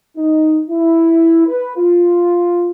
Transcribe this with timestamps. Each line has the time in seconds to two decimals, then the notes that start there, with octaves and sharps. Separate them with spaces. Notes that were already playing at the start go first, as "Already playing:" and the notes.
0.17 D#4
0.69 E4
1.47 B4
1.77 F4